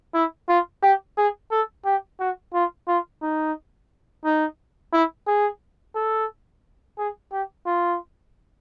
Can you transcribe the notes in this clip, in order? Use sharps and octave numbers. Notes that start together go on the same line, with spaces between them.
E4
F4
G4
G#4
A4
G4
F#4
F4
F4
D#4
D#4
E4
G#4
A4
G#4
G4
F4